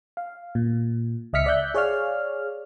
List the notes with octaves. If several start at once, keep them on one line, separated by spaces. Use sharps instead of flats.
F5
A#2
C#2 D#5 E5 F6 B6 C#7
D5 E5 F#6 G6
G#4 C#5 D5 F5 F6